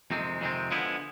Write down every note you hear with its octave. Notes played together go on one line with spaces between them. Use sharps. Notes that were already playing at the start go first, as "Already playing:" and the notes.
F2 C3 D#3 G#3 C4
F2 C3 D#3 G#3 C4
D3 F3 G#3 B3 E4